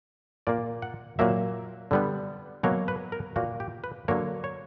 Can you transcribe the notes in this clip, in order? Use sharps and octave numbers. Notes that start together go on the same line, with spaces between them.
A#2 A#3 D5
F#5
A#2 F#3 A#3 E5
D3 G3 B3
B2 F#3 A#3 C#5
B4
A#4
A#2 A#3 F#4
G4
B4
D3 F#3 A#3 C#5
C#5